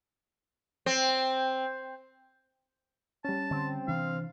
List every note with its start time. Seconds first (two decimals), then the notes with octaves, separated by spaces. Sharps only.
0.86 C4
3.25 G3 C#4 A5
3.51 D3 C4
3.88 C3 E3 D4 F5